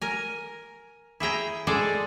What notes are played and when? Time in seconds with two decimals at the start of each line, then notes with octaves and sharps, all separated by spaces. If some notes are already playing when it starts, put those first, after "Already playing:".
0.02 A#4 G#5
1.20 E4 G#4 G5 A#5
1.67 G#3 G#4 A4 C5 D5